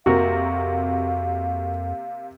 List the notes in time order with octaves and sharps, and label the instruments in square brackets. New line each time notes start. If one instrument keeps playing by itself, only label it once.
[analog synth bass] F2 [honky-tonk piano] C3 A#3 [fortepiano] F#4 A#4 [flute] F5